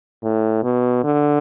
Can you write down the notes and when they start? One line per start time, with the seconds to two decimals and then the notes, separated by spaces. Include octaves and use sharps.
0.23 A2
0.63 B2
1.04 D3